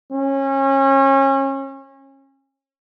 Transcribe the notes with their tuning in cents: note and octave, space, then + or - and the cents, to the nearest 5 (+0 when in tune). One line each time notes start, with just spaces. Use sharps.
C#4 -30